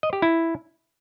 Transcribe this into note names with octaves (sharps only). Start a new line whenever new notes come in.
D#5
G4
E4